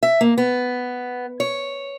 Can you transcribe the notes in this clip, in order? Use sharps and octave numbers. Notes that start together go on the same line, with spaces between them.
E5
A#3
B3
C#5